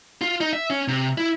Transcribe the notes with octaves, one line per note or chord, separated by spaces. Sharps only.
F4
D#4
E5
C#4
C3
E4